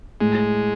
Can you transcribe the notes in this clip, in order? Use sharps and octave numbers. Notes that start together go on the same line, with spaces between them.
A2 G#3